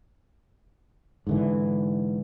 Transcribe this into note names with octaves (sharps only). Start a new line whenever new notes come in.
G#2 D3 E3